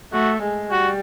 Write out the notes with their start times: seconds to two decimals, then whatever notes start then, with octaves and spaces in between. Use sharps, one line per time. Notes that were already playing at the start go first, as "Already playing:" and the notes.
0.13 A3 F#4
0.43 G#3
0.71 G3 F#4